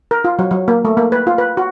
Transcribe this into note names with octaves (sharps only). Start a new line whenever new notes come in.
A#4
F4
F#3
F#3
A#3
A3
A#3
B4
F4
B4
F#4